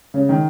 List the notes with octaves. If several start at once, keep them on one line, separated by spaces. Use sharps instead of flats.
C#3
D#3